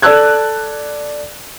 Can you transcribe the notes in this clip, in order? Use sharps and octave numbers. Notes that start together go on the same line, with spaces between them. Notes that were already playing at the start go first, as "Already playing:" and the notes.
A4 D5 A5 E6 F#6 G#6